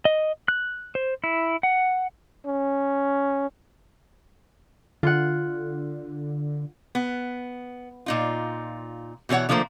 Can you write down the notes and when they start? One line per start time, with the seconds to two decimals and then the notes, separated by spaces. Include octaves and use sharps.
0.05 D#5
0.48 F#6
0.95 C5
1.24 E4
1.63 F#5
2.47 C#4
5.03 D3 F4 F#5
6.95 B3
8.06 A#2 D#4 F4
9.29 B2 E3 G4 C#5 F#5
9.49 D3 F3 A3 A#3 C5